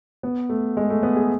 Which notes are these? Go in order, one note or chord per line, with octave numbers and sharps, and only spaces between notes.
B3
A3
G#3
A3
B3
G#4